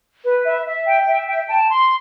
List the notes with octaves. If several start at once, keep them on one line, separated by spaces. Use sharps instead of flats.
B4
E5
E5
G5
E5
G5
A5
C6